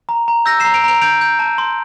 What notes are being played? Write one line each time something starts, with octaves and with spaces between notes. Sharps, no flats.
A#5
A#5
E6 G6 A#6
A#5 C7 E7
D7 F7
A#5 D7 F7
G6 D7 F7
G6
A5
C6